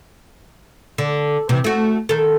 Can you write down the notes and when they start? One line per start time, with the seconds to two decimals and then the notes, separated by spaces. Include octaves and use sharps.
0.98 D3
1.49 C3 E3
1.64 A3 F#4
2.09 D#3 A4